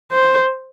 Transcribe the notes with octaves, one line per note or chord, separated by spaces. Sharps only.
C5